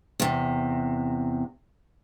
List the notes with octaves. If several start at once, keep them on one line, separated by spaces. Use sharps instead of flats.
E2 C3